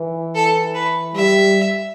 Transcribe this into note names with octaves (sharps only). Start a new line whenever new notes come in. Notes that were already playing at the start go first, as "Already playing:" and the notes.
Already playing: E3
A4
B4
G3 E5